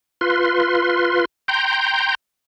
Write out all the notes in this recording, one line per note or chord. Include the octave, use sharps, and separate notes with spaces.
F4 B4 C6
G5 A#5 C6 G6